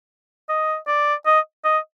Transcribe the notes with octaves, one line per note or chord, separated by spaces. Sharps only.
D#5
D5
D#5
D#5